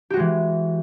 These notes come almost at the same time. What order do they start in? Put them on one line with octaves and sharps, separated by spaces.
G4 F#4 G#3 E3